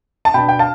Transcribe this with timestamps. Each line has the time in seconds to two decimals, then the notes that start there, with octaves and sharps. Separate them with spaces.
0.25 A5
0.34 B2 B3 D4 G5 B5
0.49 G5
0.59 F5 A5